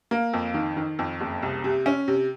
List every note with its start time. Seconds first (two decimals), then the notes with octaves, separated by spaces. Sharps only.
0.11 A#3
0.33 F2
0.54 D#3
0.77 D#3
0.99 F2
1.21 F#1
1.43 C2
1.64 C3
1.86 C#4
2.08 C3